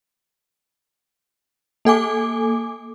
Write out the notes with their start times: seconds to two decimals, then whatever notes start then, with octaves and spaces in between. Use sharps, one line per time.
1.85 A#3 A4 G#5 D6